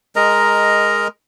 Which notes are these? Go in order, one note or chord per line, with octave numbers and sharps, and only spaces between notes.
G#3 A#4 D#5 A#5